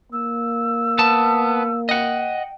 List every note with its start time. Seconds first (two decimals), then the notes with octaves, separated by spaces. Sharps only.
0.12 A#3 E6
0.99 B3 A5
1.89 D#5 F#5 G5